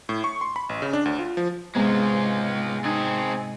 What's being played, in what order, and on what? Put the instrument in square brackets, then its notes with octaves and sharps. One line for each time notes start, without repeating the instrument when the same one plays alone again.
[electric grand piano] A2
C#6
C6
B5
A1
C#3
D4
D2
F4
F3
[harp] G#2 C3 B3 [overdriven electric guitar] G#3 F4
[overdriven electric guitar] C4 G#4 [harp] D#4